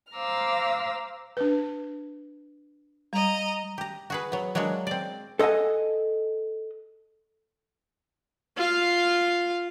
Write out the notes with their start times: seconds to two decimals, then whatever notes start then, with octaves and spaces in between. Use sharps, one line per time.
0.15 C5 F5 A#5 D6 E6 F6
1.37 D4 B4
3.13 G3 D#5 A#5
3.78 G4 A#5
4.10 F#4 G#4 B4
4.32 F#3 B3
4.55 F#3 G#3 A#3 D4 F#4
4.87 C4 D5
5.39 A4 D#5 F5 F#5 G#5
8.56 F4 F5